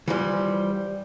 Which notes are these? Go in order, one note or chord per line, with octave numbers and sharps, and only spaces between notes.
E3 F3 G3